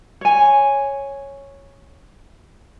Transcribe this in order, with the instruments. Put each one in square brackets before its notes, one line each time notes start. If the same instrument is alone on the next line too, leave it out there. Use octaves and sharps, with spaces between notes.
[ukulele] C#5 G#5